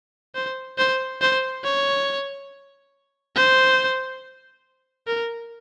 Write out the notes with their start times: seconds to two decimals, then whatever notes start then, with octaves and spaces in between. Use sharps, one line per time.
0.35 C5
0.78 C5
1.21 C5
1.64 C#5
3.36 C5
5.07 A#4